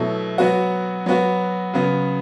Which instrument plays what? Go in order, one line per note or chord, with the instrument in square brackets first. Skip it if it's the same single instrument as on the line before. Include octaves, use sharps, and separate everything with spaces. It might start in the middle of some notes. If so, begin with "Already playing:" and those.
Already playing: [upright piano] B2 F#3 A3 E4
F#3 B3 F#4
F#3 B3 F#4
C#3 F#3 B3